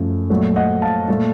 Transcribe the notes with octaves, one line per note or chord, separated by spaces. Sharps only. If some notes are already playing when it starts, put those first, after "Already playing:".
Already playing: F#2 F3 A3
A#2 F#3 A3
D#5 F#5
F5 A5
A#2 A3